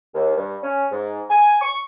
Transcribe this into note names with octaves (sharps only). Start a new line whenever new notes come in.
D#2
G2
C#4
G#2
G#5
C#6